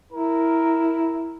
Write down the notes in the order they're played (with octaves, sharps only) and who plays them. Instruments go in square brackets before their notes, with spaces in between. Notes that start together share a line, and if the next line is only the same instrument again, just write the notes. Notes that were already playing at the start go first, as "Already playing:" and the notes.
[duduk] E4 [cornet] A#4